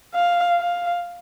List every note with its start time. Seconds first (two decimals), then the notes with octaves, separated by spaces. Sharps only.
0.14 F5
0.58 F5